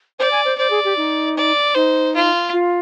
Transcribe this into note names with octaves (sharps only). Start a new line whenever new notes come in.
C5 D5
G#5
C5
C5 D5
G#4
G4
D#4
D5
D#4 C5
F4
F4